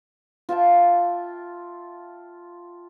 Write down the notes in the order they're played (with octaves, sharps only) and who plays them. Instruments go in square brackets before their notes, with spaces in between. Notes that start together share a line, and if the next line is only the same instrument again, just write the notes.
[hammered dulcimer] F4 E5 G5 A5